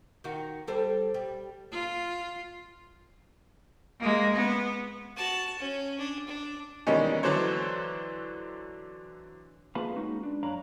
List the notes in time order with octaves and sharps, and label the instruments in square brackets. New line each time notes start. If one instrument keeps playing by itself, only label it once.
[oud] D#3 F#4
G3 A4 C5
G3
[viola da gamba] F4
[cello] G#3 A#3
B3
[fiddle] F#4 A5
C#4
D4
D4
[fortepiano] B2 D#3 E3 G3 G#3 C#4
D3 E3 F#3 D4 C5 C#5
[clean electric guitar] A#3 F4 G#4 B4 F5 B5
G#3 C#4 D#4 F#4
D4
F#2 D4 C#5 F5 A#5 B5